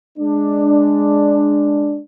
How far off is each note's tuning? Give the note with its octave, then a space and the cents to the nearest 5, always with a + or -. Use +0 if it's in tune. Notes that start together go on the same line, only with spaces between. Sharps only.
G#3 +0 D4 +0